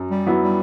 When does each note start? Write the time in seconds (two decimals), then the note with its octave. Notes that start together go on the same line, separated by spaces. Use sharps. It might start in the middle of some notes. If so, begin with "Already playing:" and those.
Already playing: F#2
0.11 G3
0.26 F#3 B3 E4
0.42 G3